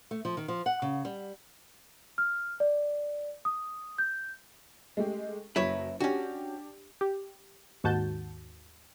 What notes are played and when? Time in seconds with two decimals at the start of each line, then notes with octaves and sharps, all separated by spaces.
0.11 A3
0.25 F3
0.37 D#3
0.48 F3
0.66 F#5
0.82 C#3
1.05 G3
2.18 F6
2.60 D5
3.45 D#6
3.98 G6
4.97 G#3 A3 G4
5.56 F#1 F#3 E4 B4 C#5
6.00 C#4 D4 F#4 G4
7.01 G4
7.84 D#2 G#2 F#4 A5 G6